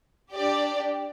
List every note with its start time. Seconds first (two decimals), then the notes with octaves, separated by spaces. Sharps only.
0.33 D4 G4 D5